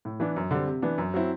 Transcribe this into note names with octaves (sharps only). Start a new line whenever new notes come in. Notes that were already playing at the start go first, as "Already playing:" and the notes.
A2
E3 B3 D4
F#2
D3 G3 C4
C3
E3 B3 D4
F#2
F#3 C4 E4